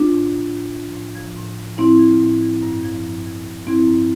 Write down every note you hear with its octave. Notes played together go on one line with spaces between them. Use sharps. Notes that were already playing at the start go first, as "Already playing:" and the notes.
Already playing: D4 F4
A2
F3
A2
F3
A2
F3
A2
F3
A2 C4 E4
F3
A2
F3
G2
F3
G2
F3
G2
F3 C4 E4
G2